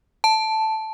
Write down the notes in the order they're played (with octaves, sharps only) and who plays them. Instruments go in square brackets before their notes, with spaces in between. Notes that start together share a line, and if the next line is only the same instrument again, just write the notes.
[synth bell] A5